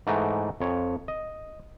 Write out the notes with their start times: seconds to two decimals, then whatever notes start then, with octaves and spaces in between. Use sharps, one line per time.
0.07 G#2 E3 A3 F#5 G5 A#5
0.60 F2 C#5
1.08 D#5